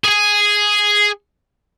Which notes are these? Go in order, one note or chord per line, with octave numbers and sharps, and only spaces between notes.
G#4 G#5